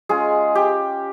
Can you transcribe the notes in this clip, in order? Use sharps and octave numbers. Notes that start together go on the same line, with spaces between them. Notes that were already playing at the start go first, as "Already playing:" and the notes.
G#3 C#4 F4 G#4
G4